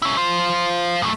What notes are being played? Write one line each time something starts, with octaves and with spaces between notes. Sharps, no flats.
C#4 E4
F4 C5
F#2 A3